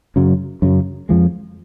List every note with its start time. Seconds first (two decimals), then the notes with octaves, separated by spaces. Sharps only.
0.16 F#2 C#3 F#3
0.62 F#2 C#3 F#3
1.09 F2 F3 G#3